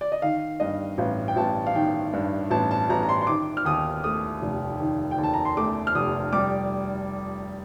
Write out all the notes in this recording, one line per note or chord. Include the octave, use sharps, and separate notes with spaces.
D5
D#5
D#3 F5
G2 D#5
A1 F5
G5
A1 A5
F5
D#3 G5
G2
A1 A5
A5
A1 A#5
A#5
C6
C6
D#3 D6
F6
D#2 D#6
A3 D#6
F1
D#3
G5
D#2
A5
A#5
C6
A3 D6
F6
F1 D#6
G3 D6